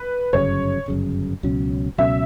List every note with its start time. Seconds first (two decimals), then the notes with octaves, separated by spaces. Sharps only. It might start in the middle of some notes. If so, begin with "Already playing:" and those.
Already playing: B4
0.33 G1 F#2 C#3 C#5
0.88 G1 F#2 C#3
1.43 C#2 B2 F#3 C#4
1.98 C#2 B2 F#3 C#4 E5